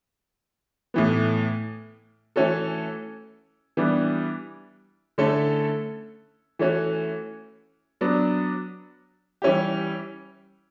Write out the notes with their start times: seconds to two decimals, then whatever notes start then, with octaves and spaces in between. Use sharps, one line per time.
0.94 A2 E3 B3
2.36 E3 A3 C#4 F#4 A4
3.77 E3 G3 B3 D4
5.18 D3 A3 C#4 E4 A4
6.59 E3 A3 C#4 F#4
8.01 F#3 B3 D4
9.42 E3 G3 C#4 E4 G4